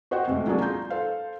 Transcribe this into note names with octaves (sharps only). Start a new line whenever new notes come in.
F#4 C5 D#5 F#5 G5
C2 F2 G#3 A3
F#3 A#3 C#4 D4 G#4
F4 A#5 G6
A4 C5 F5